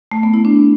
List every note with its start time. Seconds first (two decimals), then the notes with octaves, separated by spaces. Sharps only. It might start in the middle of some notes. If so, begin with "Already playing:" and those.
0.12 A3
0.23 B3
0.34 E4
0.45 D4